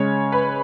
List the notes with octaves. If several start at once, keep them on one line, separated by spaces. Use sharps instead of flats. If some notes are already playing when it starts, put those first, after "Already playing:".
Already playing: C#3 G#3 C#4 C#5
B4